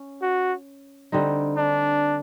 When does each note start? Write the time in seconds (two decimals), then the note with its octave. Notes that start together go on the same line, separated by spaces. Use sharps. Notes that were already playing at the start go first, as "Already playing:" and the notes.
Already playing: C#4
0.22 F#4
1.12 D3 G3 C4 D#4
1.57 D4